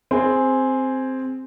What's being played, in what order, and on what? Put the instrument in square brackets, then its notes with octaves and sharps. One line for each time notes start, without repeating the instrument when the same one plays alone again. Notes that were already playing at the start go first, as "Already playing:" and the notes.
[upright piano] C4 G#4